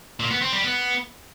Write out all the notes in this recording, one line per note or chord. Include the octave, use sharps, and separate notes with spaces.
A#2
B3
C4
G3
B3